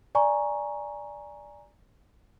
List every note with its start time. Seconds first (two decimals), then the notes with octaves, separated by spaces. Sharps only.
0.15 D5 G#5 A#5 C#6